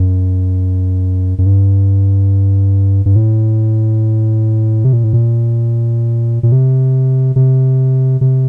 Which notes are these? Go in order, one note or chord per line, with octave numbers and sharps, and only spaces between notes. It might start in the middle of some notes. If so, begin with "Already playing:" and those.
Already playing: F#2
F#2
G2
G2
A2
C3
A#2
A2
A#2
A#2
C3
C3
C3